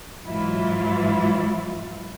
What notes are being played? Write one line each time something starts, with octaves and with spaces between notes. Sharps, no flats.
G#2 E3 F#3 E4 F4